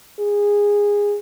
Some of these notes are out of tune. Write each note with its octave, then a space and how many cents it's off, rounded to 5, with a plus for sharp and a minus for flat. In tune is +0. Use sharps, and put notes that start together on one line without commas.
G#4 -20